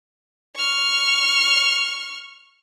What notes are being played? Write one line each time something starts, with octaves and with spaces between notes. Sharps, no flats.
C#6 F6